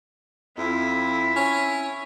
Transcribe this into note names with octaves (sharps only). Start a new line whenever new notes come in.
F2 E4
C#4